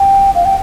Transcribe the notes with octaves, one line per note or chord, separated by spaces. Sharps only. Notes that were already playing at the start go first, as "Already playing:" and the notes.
Already playing: G5
F5
G5